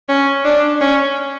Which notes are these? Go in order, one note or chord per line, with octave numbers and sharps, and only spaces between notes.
C#4
D4
C#4